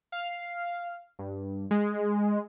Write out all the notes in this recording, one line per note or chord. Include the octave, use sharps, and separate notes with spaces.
F5
G2
G#3